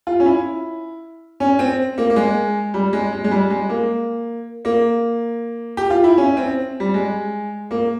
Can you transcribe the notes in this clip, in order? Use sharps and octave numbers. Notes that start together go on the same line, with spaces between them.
F4
C#4
E4
C#4
C4
A#3
A#3
G#3
G3
G#3
G#3
G#3
G3
G#3
A#3
A#3
G4
F4
E4
C#4
C4
G3
G#3
A#3